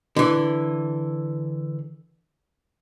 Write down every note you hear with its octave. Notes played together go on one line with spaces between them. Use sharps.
D3 E3